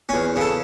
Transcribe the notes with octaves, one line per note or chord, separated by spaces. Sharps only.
E2 C#4
C#3
A4